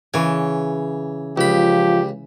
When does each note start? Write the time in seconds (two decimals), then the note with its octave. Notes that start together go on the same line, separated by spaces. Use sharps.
0.14 C#3 E3 C#5
1.38 C#2 F3 G4 B5